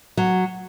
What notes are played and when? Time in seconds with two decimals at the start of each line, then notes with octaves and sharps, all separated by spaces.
0.17 F#3